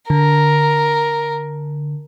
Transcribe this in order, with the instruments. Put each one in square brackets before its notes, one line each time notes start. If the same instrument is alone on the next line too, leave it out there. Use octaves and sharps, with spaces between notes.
[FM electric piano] D3 [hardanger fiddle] A#4